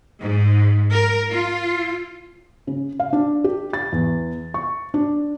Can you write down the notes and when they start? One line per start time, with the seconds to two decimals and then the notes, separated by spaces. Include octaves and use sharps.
0.23 G#2
0.92 A#4
1.32 F4
2.67 C#3
3.00 F5
3.13 D4
3.44 G4
3.73 A6
3.92 E2
4.54 C#6
4.94 D4